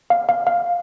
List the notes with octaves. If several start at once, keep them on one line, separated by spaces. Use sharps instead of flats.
F5
F5
F5